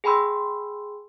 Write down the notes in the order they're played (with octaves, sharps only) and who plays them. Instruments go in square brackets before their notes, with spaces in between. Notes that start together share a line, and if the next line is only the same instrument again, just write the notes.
[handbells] G#4 G5 G#5 B5 C6 E6